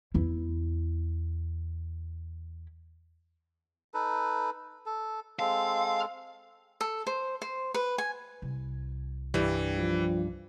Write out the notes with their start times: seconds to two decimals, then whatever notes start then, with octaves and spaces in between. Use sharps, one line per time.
0.14 E2 E4
3.94 D#4 A4 B4
4.86 A4
5.39 G#3 C4 A4 F5
6.81 A4
7.07 C5
7.42 C5
7.74 B4
7.98 G#5
8.42 C2
9.34 G2 E3 G3
9.78 F3